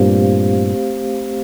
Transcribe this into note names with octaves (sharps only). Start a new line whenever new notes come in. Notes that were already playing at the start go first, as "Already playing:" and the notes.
Already playing: G2 A#2 A3 C4 G4 C5 F5